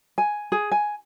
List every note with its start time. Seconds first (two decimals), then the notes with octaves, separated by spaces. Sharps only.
0.18 G#5
0.52 G#4
0.72 G#5